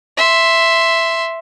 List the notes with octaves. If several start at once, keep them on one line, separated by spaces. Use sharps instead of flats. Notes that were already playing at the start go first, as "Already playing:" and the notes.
E5 C6